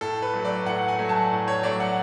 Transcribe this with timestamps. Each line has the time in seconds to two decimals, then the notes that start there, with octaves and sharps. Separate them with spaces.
0.01 A2 A4
0.22 B4
0.34 F#3 A3
0.45 D5
0.66 A2 F#5
0.88 G#5
0.99 F#3 A3
1.09 A5
1.31 A2
1.48 C#5
1.63 F#3 A3 D5
1.80 F#5